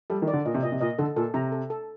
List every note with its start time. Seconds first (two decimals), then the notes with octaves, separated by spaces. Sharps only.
0.10 G3 A4
0.22 D#3
0.28 D5
0.33 D3
0.45 A#2 D#5
0.55 C3
0.63 A#2 D#5
0.72 C3
0.81 A#2 D#5
0.98 D3 A4
1.16 A#2 A4
1.34 C3 A#5
1.52 A4
1.70 A4